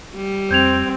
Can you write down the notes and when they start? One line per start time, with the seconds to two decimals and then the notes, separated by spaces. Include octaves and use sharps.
0.15 G3
0.51 F2 C4 G6 G#6 F7